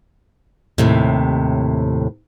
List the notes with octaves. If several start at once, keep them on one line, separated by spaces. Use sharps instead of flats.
D#2 A2 C3